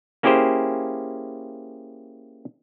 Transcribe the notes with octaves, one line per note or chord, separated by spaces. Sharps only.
A#3 C#4 E4 G4 G#4 C5